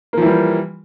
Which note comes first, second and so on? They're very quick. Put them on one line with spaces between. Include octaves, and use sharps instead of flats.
A#3 F3 E3 G3